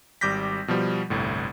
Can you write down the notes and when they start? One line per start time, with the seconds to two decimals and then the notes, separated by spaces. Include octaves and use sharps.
0.21 G#1 G3 D6 G6 A#6 B6
0.68 B2 F3 G3
1.10 G1 C2 A2